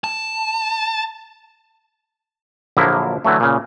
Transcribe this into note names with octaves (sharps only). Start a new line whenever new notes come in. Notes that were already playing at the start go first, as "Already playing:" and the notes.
A5
A#1 D3 F3 F#3 A#3 E4
D3 E3 F#3 A3
A#2 C#3